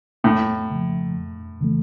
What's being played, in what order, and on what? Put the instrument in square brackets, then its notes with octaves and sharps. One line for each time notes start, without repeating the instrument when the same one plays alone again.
[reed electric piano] F2 [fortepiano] A2
[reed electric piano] C#3 F3
F2
C#3 E3 A3